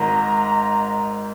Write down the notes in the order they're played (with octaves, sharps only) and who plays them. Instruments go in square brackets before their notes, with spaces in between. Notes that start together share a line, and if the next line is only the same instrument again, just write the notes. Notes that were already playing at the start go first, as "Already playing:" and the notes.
Already playing: [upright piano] G#1 G#2 D#3 [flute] A#5